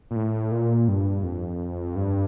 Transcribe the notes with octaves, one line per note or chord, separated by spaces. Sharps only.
A#2
A2
A#2
G2
F2
G2